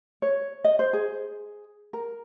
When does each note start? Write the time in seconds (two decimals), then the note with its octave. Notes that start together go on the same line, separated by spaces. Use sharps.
0.22 C#5
0.64 D#5
0.79 C5
0.93 G#4
1.93 A#4